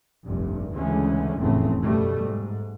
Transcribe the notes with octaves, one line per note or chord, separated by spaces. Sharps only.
F1 A#1 G2
D2 C#3 E3 G#3 C#4
F1 E2 A2 C#3 A3 C4
F#2 B2 G3 A3
G#2